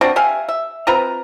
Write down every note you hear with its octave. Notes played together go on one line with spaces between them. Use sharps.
C4 D4 F4 F#4
G4 E5 F5 G#5
E5
C4 F4 B4 A#5